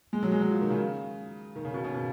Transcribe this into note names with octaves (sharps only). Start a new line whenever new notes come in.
G#3
F#3
G#3
F#3
F3
D#3
C#3
D#3
C#3
B2
C#3
B2